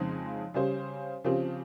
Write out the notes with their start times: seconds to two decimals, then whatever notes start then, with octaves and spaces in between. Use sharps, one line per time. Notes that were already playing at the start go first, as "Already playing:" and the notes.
Already playing: F2 C#3 G#3 C4 D#4
0.54 C#3 G3 C#4 G4 C5
1.24 C#3 F3 C4 G4